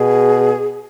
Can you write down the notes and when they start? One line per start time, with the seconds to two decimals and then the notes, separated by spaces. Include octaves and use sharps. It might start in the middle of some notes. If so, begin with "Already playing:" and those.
Already playing: B2 G#4